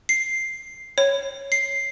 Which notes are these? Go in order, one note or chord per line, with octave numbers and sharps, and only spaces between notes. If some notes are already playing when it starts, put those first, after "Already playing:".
C7
C#5
C7